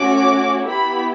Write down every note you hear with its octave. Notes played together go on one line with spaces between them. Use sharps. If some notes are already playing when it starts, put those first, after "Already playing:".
Already playing: A3 C#4 F#4 D6
B3 E4 G4 B5